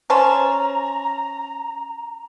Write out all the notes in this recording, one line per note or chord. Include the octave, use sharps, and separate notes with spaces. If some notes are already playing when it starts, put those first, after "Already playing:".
C#4 C5 A5 A#5